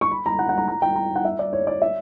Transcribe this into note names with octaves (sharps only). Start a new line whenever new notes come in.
C#6
B5
A#5
F#5
F#5
A#5
A#5
G5
A#5
F#5
E5
D5
C#5
D5
E5